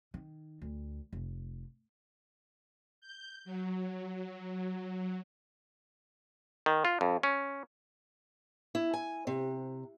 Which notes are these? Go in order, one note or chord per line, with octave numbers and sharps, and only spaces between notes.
D#3
D2
F1
G6
F#3
D#3
F4
F2
C#4
E4
G#5
C3